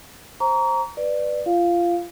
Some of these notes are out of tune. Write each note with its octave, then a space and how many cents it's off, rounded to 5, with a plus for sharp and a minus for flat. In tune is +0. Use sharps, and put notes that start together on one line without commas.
C5 +15 A#5 +0 C#6 +45
B4 +0 D5 +15
F4 -25 F5 -5